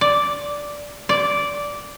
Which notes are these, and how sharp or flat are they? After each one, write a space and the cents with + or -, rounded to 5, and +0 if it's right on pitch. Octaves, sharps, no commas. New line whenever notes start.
D5 -5
D5 -10